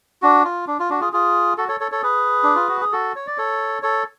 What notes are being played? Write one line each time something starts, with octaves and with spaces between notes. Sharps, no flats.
D4 F#4
F4
D4
F4
D4 F#4
F4 G#4
F4 G#4
F#4 A4
A4 C#5
A4 C#5
A4 C#5
G#4 B4
D4
F4
F#4
G#4
F#4 A4
C#5
D5
A4 C#5
A4 C#5